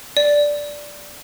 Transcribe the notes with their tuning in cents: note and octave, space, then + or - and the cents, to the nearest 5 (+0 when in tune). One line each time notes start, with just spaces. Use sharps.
D5 -5